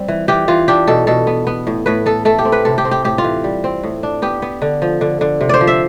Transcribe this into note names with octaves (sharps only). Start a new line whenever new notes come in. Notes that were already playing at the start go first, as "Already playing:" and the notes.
Already playing: G3 C4
E3
E3 G4
E3 F4
D4 G4
B2 A4
B2 A4
B3
B3
A2
A2 B4
B3 A4
A3 A4
G4
C4
B4
C3 A4
G4
C4
G4
A2 G4
F4
E3
G3
C4
A2
D4
B3 G4
B3
D3
F3
D3
D3
C3
C5 D5
F3
E5